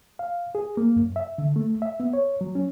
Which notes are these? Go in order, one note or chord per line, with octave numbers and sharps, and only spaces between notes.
F5
G#4
A#3
F#2
E5
D3
A3
E5
B3
C#5
F#3
C#4